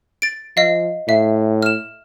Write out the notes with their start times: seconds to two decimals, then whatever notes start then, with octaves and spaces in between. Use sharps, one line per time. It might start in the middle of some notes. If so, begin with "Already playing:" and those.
0.22 A6 D7
0.57 F3 D#5 F5
1.08 A2 E5 F5
1.63 F6 E7